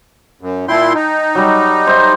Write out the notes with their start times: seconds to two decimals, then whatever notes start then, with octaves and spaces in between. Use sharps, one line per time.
0.41 F#2
0.68 A#2 E4 G5 A5 C6
0.95 D#4
1.35 F#3 G3
1.87 C5 E5